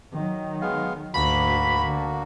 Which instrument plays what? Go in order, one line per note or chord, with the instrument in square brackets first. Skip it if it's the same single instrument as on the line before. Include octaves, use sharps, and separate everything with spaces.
[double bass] D#3 F#3
[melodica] G#3 B3 F5
[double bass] D2 G#2 [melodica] A#3 F#4 [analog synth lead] B5
[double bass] D3